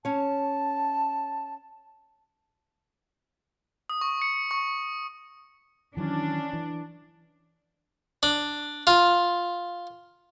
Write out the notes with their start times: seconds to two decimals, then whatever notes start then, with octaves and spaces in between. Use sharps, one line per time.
0.05 C#4 C#5 A5
3.90 D#6
4.01 C#6
4.22 C#7
4.51 C#6
5.97 D#3 E3 F#3 C#4 D4
6.53 E3
8.23 D4
8.87 F4